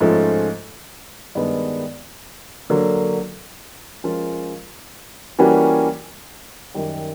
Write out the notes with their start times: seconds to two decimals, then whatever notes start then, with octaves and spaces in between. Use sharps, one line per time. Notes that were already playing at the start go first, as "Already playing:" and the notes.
0.01 G#2 F3 A3 C#4
1.35 G2 D#3 G#3 B3 D#4
2.70 D3 F#3 A#3
4.04 F3 G#3 C#4 F4 A#4
5.39 E3 G3 A#3 C#4 F#4
6.74 F#2 D#3 G3